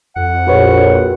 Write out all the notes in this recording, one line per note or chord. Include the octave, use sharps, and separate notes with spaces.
F2 F#5
A#1 F#4 B4 C#5